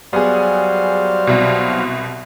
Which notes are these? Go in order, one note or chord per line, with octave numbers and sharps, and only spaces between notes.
F#3 G3 B3 G#4 C5 F5
C2 B2